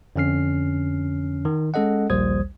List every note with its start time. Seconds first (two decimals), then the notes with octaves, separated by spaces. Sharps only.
0.16 F2 D3 C#4 F6 C7
1.45 D#3
1.74 G#3 C#4 A4 D#5 F#5
2.10 A#1 D#2 G3 C5 D#6 G#6